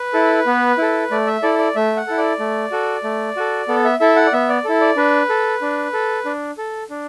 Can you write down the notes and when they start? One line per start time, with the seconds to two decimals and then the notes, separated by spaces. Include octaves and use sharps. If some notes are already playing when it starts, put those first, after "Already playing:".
Already playing: B4
0.13 E4 A4
0.46 B3
0.78 E4 A4
1.11 A3 D5
1.27 E5
1.42 E4 A4 D5
1.58 D5
1.76 A3 E5
1.97 F#5
2.07 E4 A4
2.18 D5
2.39 A3
2.71 F#4 A4
3.04 A3
3.36 F#4 A4
3.68 B3 A4
3.85 E5
4.00 E4 A4 E5
4.16 F#5
4.26 D5
4.33 B3 E5
4.49 D5
4.65 E4 A4
4.81 D5
4.96 D4 B4
5.29 A4
5.61 D4
5.93 A4
6.25 D4
6.58 A4
6.90 D4